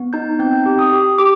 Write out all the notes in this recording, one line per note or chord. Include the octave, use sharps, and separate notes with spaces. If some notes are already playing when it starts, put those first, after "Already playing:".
Already playing: B3
D#4 G6
C4 G6
G4
D#6
G4
G4 D6